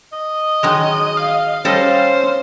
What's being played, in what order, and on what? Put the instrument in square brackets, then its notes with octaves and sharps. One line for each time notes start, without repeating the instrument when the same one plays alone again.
[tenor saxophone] D#5
[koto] D#3 F#3 G#3
[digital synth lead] F5
[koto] G3 A4 D#5 [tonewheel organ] C#4 [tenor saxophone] C5